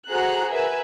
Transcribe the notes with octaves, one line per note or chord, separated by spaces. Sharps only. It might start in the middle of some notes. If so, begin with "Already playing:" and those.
F#4 G#4 A4 C5 A#5 F#6
A#4 B4 E5 G#5